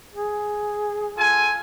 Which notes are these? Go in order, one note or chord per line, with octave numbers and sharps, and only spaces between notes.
G#4
F4 A4 G#5